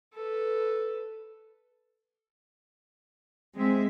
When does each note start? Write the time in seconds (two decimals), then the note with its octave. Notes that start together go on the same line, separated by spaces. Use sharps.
0.14 A4 B4
3.56 G#3 C4 E5